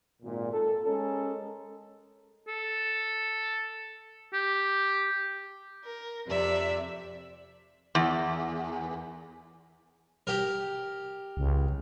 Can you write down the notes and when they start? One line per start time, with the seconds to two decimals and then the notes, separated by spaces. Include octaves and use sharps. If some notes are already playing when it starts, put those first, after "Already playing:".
0.22 G#1 A#2
0.53 A4
0.85 G#3 C#4 A4 A#4
2.48 A4
4.33 G4
5.85 A#4
6.27 F2 C3 D5 E5
7.95 E2
10.27 G4 A#4
11.37 C#2